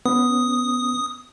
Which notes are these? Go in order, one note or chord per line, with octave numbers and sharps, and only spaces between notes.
B3 C#4 D#6